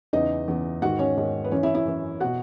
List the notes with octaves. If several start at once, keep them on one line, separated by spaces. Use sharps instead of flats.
E2 C#3 E3 D#4 D#5
E2 C#3 E3
G#2 D#3 F#4 F#5
C#4 C#5
G#2 D#3
B4
F#2 E3 C#4 C#5
E4 E5
E4 E5
F#2 E3
B2 F#4 F#5